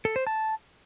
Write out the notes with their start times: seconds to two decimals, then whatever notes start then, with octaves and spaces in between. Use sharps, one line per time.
0.05 A4
0.16 C5
0.27 A5